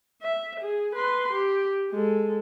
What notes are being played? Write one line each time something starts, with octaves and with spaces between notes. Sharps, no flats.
E5
G#4
B4 C6
G4
G#3 A4